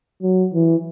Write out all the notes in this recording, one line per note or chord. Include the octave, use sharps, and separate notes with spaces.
F#3
E3